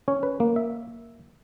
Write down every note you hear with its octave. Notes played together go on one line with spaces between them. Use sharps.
C#4 C#5
B4
A#3
E5